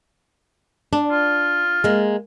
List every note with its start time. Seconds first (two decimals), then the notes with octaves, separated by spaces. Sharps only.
0.93 D4
1.11 F4
1.84 G#3 A#3